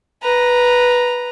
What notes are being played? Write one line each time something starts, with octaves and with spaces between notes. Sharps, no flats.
B4 A#5